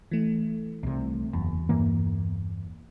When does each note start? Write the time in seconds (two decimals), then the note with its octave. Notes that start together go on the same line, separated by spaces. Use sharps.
0.11 E3 A3
0.83 C2 C3
1.33 F#1 E2
1.69 G2 E3 A#3